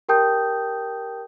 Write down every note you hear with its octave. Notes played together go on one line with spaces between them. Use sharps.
G4 A#4 G5 A5 D#6 G6